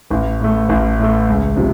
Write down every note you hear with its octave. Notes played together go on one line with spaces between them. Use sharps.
A1
A2 A3
A1
A2 A3
C#2
C3 F3